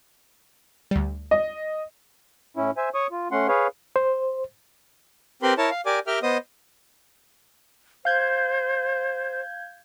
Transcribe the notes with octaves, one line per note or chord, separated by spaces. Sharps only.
D2 G3
D#5
A2 C#4 E4
C5 E5 G#5
C#5 C#6 D#6
F4
A3 C#4 F#5 C6
G#4 B4 C#5 F5
C5
C4 G4 A#4 B4 B5 C6
E4 A#4 C#5 A5
F5
G4 A#4 D5 G#5 D6
G4 A#4 E5 G5 F6
B3 C5 D#5 D#6
C5 F5 G6 G#6